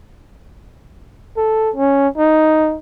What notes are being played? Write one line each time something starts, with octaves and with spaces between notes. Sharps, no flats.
A4
C#4
D#4